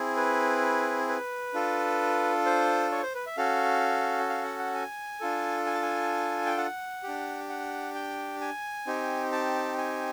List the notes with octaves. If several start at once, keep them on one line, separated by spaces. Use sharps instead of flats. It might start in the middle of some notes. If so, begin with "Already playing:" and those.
Already playing: C4 E4 G#4
B4
B4
D4 F4 A4
C5
C#5
C5
B4
E5
C#4 F#4 A4 F5
F5
F#5
F#5
G#5
D4 F4 A4
G#5
A5
G#5
G5
F#5
D4 G4
F#5
G5
G#5
C4 D#4 G4
A5
G#5